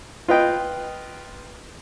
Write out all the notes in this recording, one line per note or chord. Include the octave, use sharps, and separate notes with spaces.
F4 B4 D#5 G5